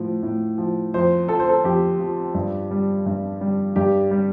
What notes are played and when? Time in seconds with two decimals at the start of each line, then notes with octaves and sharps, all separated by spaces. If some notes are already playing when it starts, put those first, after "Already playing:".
Already playing: A2 F3
0.23 A2
0.58 F3
0.94 F2 C5
1.28 F3 A4
1.40 C5
1.49 A4
1.64 F2 G4
2.00 F3
2.34 G2
2.71 G3
3.06 G2
3.41 G3
3.76 G2 G4
4.11 G3